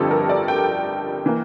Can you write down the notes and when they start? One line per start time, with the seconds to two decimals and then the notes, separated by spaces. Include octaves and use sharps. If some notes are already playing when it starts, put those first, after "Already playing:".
Already playing: G1 F2 D3 G3 G4 A4
0.11 A#4
0.29 D5
0.48 G5
1.26 E3 A#3